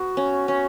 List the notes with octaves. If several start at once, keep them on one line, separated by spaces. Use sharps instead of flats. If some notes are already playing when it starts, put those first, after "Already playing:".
Already playing: B3 F#4
C#4
C#4